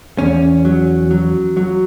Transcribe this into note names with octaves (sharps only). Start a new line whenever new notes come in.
E2 C#4
F#3
F#3
F#3